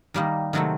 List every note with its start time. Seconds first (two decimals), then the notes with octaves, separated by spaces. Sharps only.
0.14 D#3 G3 A#3 D#4
0.53 C3 D#3 F#3 A3 C4